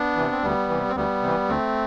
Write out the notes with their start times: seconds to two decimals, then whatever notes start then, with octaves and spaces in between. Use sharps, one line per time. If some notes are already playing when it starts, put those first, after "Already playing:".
Already playing: B3 D4
0.16 C3 E3
0.31 C4
0.42 D2 G3 B3
0.69 C3 E3
0.89 C4
0.95 D2 G3 B3
1.22 C3 E3
1.48 D2 A3 C4